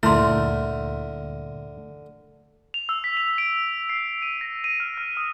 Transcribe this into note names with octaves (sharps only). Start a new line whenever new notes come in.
D2 G2 A#2 D3 A3 E4 A#4 C6
F7
E6
B6
F7
D7
C7
D#7
A#6
D#7
F6
F6
D#6